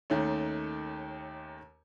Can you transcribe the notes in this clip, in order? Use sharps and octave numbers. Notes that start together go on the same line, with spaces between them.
D#2 D#3 A3 C#4